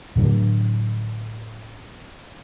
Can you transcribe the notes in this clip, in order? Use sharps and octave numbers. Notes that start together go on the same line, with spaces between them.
A2 D3 F#3